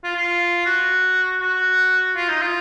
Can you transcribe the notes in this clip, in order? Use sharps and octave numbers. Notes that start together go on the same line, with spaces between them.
F4
F4
F#4
F#4
F4
D#4
F4